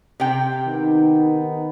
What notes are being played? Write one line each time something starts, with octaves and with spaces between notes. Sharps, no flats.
C3 G5
D#3 B3 D#4